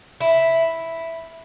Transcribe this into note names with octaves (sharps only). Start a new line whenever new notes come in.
E4